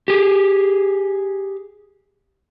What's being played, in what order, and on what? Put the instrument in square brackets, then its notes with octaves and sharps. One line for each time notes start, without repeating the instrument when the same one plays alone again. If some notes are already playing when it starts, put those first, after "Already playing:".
[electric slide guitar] G4 G#4